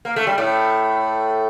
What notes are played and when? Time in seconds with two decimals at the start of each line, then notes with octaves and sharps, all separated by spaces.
0.05 A#3
0.16 A3
0.27 G3
0.38 A2 A3